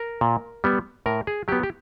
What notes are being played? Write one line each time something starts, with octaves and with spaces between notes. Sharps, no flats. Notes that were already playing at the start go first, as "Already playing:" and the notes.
Already playing: A#4
A#2
G3 B3
A2 A#4
G#4
F#3 B3 G4
G4